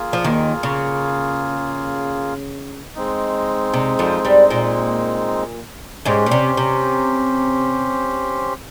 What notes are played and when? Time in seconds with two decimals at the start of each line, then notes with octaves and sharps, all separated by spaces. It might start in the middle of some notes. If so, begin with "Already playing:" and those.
Already playing: A#3 F4 G#4
0.13 F3
0.24 D#2 D#3
0.63 C#3
2.95 G#3 C4 D#4
3.73 C3
3.99 F2 F3
4.25 G2 G3
4.50 A#2 A#3
6.05 G#2 G#3 C#4 G4 C5
6.26 A#2
6.31 C3
6.57 C3